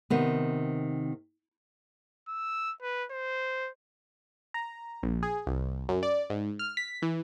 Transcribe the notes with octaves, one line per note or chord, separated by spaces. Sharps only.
C3 D#3 B3
E6
B4
C5
A#5
A#1
G#4
C2
F#2
D5
G#2
F6
B6
E3